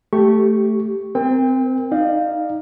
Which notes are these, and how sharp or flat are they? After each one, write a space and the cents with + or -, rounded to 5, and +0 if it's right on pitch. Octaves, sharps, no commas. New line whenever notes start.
A3 +0 G4 +0 C#6 +0
C4 -20 A#4 +0 G5 +30
D#4 +10 D5 +40 F5 +0